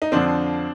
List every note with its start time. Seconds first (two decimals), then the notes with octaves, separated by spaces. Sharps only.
0.02 D#4
0.12 F2 D3 F3 C4 D4